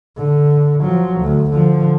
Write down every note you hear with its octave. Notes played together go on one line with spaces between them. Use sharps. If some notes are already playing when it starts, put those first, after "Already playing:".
D3
F3 F#3
D2
D3 F3